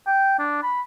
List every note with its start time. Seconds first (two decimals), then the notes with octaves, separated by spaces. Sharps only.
0.07 G5
0.39 D4
0.63 B5